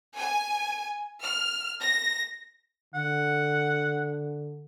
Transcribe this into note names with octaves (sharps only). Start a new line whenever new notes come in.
G#5
F6
A#6
D3 F#5